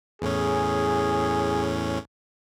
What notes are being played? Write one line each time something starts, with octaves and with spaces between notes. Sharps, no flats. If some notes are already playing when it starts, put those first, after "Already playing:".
E2 A2 C#4 G#4